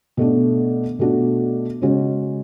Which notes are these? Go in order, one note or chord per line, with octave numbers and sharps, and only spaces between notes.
B2 A3 D4
B2 A3 D4 F#4
C#3 G#3 C#4 F#4